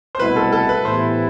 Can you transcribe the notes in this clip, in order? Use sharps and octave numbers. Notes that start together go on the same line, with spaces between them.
C5
C2 B2 A3 E4 B4
A4
A4
B4
A2 E3 B3 E4 G4 C5